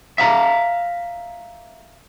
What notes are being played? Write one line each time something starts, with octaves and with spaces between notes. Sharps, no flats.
E5 F5 A#5